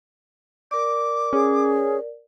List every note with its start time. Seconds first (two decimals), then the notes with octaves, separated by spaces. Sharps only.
0.71 A#4 D5 D6
1.33 C#4 G#4